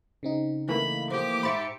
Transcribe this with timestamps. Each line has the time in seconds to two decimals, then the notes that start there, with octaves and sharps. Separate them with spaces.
0.23 C#3 C4 D#4
0.69 E3 A3 A#3 B5
1.10 F3 G4 D6
1.43 G#2 E5 B5 C6 A6 C#7